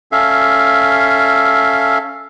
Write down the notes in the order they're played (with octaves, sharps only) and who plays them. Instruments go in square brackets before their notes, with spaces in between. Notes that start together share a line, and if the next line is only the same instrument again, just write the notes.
[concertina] C#4 A4 E5 F5